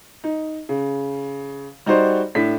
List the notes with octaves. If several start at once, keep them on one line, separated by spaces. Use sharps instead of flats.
D#4
C#3
G3 D#4 F#4 C5 D5
A2 D4 B6